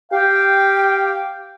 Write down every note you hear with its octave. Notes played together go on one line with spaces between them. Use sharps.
G4 F5 G5